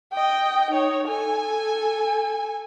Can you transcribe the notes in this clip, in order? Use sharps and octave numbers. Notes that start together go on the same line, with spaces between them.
D#5 G5
D#4 C#5
A4 G#5